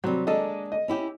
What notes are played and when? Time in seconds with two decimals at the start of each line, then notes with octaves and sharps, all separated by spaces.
0.04 C3 F#3 G3
0.27 G#3 A#3 D4 A4 D#5
0.72 D#5
0.88 C#4 E4 G4